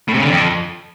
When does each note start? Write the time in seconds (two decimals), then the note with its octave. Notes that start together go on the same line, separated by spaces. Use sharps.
0.08 A2
0.14 C3
0.19 C#3
0.24 D3
0.30 F2